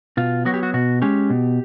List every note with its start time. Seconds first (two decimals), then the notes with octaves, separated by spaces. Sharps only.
0.17 B2 F4
0.45 F#3 B3 F#4
0.54 G4
0.63 F#4
0.74 B2 F#4
1.02 G#3 C#4 G4
1.30 B2